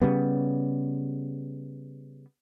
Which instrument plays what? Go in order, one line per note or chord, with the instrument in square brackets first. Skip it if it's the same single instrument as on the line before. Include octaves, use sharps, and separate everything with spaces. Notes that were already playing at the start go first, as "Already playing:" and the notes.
[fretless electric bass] C#3 G3 B3